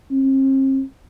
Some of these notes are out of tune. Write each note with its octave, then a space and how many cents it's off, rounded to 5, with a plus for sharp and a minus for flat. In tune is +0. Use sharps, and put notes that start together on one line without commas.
C4 +40